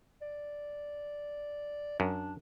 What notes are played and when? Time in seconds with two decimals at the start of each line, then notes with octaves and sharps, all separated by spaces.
0.22 D5
2.00 F#2 D4